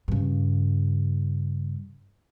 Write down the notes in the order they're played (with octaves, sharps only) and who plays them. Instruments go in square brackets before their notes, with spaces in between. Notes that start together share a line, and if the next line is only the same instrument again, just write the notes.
[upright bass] G2 C#3